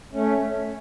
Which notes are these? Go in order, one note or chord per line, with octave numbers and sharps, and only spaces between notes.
A3 C#4